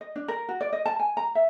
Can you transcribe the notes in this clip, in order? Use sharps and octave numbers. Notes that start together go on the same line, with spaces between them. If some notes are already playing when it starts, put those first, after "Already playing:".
D#5
D4
A#4
F#4
D5
D#5
A5
G#5
A#5
E5